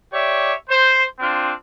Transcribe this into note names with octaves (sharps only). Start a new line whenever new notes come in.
G4 C#5 D5 E5
C5
C4 D4 F4